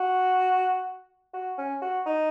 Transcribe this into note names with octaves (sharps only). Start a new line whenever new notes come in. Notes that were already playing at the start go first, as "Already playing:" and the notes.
Already playing: F#4
F#4
C#4
F#4
D#4